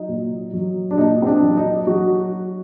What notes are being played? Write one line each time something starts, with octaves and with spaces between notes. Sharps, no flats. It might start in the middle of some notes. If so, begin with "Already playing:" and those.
Already playing: F#3 D#4
A#2
F#3
D4
A#2 D#4
C4
D4
F#3
D#4
F#3 F#4